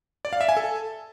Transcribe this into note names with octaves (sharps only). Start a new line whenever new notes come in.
D5
F5
E5
G#5
A4